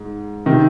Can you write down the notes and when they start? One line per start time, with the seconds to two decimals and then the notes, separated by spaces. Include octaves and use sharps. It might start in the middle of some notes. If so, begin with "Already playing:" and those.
Already playing: G#2
0.46 C3 D#3